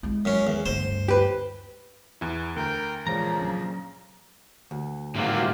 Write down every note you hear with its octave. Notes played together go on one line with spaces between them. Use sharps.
G#3 E4
F#2 C#4
E2
D2 G2 C5
G4 B4
E2 E4
D2 A#4 G5
A#2 C#3 E3 F3 G#3 A#5
F#3 C#4
D2
G#1 A2 C3 G3 A#3 F4 F#4